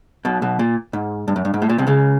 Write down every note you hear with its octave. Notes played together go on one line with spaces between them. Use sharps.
B1 B2
B1 B2
A#2
G#2
G2
F#2
G2
G#2
A2
A#2
C2 C3
C#2 C#3